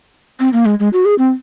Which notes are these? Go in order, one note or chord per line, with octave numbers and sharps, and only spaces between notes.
C4
A#3
G#3
G#3
F#4
G#4
C4